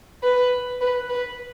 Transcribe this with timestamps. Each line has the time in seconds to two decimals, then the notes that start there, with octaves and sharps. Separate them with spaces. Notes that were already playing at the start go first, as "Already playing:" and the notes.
0.23 B4
0.81 B4
1.09 B4